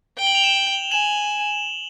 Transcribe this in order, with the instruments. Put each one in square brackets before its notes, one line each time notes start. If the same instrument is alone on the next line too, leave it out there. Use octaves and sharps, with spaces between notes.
[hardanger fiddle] G5 [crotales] G7
[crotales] F#7
F7
E7 F#7
[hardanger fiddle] G#5 [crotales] E7 F#7